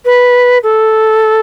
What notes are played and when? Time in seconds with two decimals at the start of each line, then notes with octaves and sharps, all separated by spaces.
0.05 B4
0.63 A4